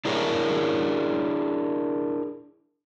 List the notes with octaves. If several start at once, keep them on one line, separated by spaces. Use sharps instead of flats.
D4 E4 G#4 A#4 C#5